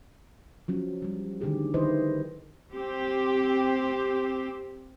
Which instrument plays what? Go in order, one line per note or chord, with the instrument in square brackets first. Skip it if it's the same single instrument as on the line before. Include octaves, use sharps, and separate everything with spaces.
[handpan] F3 F#3 C#4
F3 G3
D3 D#3 A3 G4 G#4
D#3 E4 B4 C5 D#5
[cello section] C4 G4